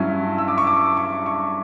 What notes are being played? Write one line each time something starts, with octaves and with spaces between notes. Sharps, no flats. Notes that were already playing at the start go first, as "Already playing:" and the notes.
Already playing: G2 F#3 C#4 E4
E6
D6
C#6
D6
C#6
C#6